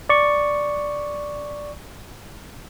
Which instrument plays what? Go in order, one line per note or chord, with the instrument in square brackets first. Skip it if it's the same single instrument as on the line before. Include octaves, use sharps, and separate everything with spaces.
[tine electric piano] D5 C#6